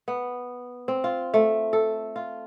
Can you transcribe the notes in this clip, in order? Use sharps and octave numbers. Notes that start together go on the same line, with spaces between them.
B3
C4
F4
A3
A4
F4